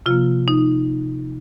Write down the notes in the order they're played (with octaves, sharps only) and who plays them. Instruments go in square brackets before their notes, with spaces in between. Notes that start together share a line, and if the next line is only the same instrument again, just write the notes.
[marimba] C3 F3 A#3 F4
D#4